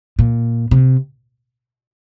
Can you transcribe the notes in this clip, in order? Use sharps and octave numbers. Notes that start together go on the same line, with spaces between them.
A#2
C3